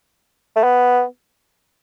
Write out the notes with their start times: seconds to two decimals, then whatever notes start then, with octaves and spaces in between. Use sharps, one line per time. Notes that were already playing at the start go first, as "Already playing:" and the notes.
0.56 A3
0.64 B3